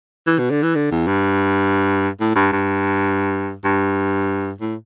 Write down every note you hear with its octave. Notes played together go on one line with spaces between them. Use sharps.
E3
B2
D3
E3
D3
E2
G2
A2
G2
G2
G2
A2